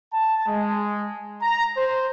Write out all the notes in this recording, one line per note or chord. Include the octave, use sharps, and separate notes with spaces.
A5
G#3
A#5
C5